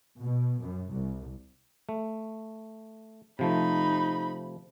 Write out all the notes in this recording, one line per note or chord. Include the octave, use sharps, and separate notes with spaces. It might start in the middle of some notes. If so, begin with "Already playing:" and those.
B2
F#2
C2
A3
C3 F3 A3 D#4 B5